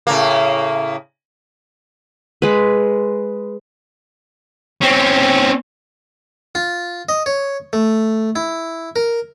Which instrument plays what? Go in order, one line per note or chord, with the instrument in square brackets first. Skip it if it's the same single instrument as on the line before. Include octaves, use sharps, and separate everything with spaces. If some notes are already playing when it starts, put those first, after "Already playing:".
[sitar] A2 C#3 A#3
[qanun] G#3 B4
[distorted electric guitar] C4 C#4
[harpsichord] F4
D#5
C#5
A3
E4
A#4